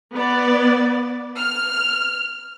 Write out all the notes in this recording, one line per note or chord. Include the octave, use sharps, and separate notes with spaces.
B3 D5
F6